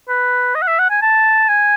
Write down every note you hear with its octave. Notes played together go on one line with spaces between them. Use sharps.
B4
D#5
F#5
E5
F#5
G#5
A5
G#5